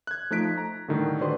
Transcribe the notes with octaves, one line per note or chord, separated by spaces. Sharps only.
F#6 G#6
F3 A3 D#4 F#6 B6 D7
A#5
A2 D3 D#3 G3
D3 F#4 B4 C5 D5 C6